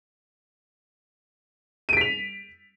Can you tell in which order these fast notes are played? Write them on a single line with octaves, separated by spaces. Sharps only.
D#7 D7 B6 F7